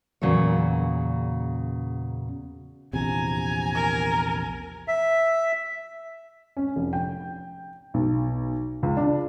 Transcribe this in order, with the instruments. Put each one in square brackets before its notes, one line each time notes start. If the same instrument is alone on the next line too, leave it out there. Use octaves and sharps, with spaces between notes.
[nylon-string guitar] E2 A#2 C#3 F#3 F#4 C#5
[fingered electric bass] A#1 E2 C3 [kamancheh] G#5 A#5
[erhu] A#4
[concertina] E5
[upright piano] C#4
F1
G5
B1
C#2
D4